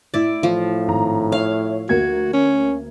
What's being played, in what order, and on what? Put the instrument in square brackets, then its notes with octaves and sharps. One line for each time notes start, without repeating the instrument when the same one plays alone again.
[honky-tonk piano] A2 [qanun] E4 D5
[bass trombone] A2 [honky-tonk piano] E3 [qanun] F3
[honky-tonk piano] G#1 A#5
[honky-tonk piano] C#5 E5 [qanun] F5
[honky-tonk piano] D2 A#3 G#6 [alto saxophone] F#4
[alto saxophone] C#4